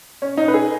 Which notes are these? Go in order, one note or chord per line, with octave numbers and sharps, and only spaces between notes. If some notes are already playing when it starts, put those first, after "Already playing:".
C#4
D#4
B4
G#4